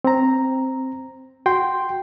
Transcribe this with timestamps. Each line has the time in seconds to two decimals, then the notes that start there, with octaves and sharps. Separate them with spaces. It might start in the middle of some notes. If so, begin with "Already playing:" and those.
0.04 C4 A#5
1.46 F#4 G5 C6